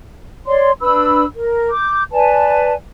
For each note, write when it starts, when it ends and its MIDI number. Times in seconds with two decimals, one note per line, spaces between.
0.46 0.71 73
0.46 0.71 74
0.46 0.71 84
0.81 1.24 62
0.81 1.24 71
0.81 1.24 83
0.81 1.24 88
1.35 1.69 70
1.71 2.03 86
1.71 2.03 91
2.12 2.73 71
2.12 2.73 74
2.12 2.73 80
2.12 2.73 81